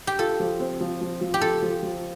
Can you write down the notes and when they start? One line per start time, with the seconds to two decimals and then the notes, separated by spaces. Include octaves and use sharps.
0.07 G4
0.19 F4 A4
0.40 F3
0.60 C4
0.80 F3
1.01 F3
1.21 F3
1.34 G4
1.41 F4 A4
1.62 F3
1.83 F3